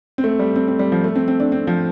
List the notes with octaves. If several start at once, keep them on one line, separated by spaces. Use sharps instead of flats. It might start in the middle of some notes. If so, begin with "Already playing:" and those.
C4
A3
G3
C4
C4
G3
F3
A3
C4
C4
D4
C4
F3